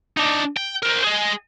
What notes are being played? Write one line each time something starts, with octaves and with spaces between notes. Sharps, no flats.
D4 D#4
G5
A#4 C5
G#4 D#5